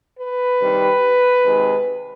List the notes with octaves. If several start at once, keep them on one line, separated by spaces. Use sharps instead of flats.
B4
C3 D#3 G3
C3 D#3 G#3